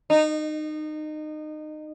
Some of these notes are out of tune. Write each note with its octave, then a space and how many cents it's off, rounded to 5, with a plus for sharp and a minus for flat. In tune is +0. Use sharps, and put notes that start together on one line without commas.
D#4 -25